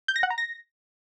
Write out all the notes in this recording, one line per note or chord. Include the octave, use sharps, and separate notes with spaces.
G6
A#6
F#5
A#5
A#6